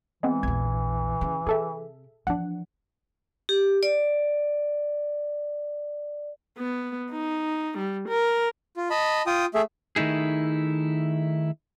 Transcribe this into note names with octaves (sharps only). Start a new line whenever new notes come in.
E3 G#3 B3 C4
A#1 E2 G#6
C#3
C3 G#4 A4 E5
E3 F3 D4 F#5
G4
D5
B3
D#4
G3
A#4
F4
D#5 A5 B5
F4 G5 D#6
A3 G#4 E5
D#3 A3 D#4 E4 G#4